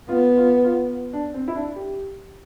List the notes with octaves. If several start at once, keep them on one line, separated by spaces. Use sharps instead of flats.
B3 F4
F4
F4
D4
C4
E4
D4
G4